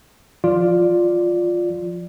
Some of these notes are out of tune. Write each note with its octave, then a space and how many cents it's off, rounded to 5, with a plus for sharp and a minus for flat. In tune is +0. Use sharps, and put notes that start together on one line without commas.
F3 +0 F4 +5 D5 +0